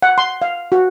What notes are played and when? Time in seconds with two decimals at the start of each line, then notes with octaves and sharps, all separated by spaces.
0.02 F#5
0.18 C6
0.42 F5
0.72 F#4